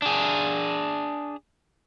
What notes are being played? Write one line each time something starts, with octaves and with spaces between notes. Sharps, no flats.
D4 G#4